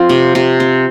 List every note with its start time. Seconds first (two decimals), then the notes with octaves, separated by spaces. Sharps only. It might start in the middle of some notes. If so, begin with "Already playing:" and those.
Already playing: C4 F4
0.09 C3
0.35 C3
0.60 C4